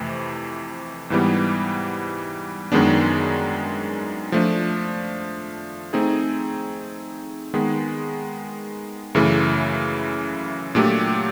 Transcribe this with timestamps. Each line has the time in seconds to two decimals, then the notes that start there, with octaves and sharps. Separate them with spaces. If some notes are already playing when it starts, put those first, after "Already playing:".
Already playing: F2 C3 E3 A3
1.10 G#2 E3 G3 B3
2.72 F#2 D#3 G#3 B3 D4
4.32 F3 A3 D4
5.93 A3 C4 D#4 G#4
7.54 D#3 G#3 B3
9.15 F#2 C#3 E3 A3
10.75 A#2 F#3 A3 D4 G4